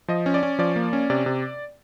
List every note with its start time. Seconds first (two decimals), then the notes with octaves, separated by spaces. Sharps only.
0.08 F3 D#5
0.26 C#4
0.34 D5
0.43 C#4
0.59 F3 D5
0.76 A#3
0.93 C#4
1.10 C3 D5
1.26 C3